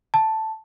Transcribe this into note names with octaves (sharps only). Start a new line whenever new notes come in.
A5